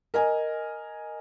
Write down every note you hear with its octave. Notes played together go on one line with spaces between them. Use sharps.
A#4 D#5 G#5